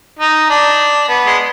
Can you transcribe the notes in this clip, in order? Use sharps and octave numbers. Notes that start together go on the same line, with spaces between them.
D#4
D4
B3
G#3